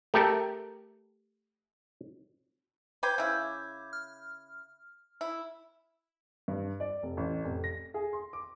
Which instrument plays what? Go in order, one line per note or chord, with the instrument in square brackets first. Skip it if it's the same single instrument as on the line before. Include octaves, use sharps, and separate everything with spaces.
[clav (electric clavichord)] A3 G4 A4 A#4
[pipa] B4 C5 G5 [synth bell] D6 G6 G#6
[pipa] C#3 E4
[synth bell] F6
[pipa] E4
[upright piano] G2
D5
F1
A1
F1
A#6
G#4
C6
D6